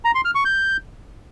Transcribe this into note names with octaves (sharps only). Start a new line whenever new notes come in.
A#5
C6
F6
C#6
G6